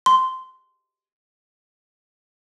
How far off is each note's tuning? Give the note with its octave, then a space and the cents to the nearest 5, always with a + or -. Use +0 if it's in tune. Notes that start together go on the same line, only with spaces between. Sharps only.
C6 -15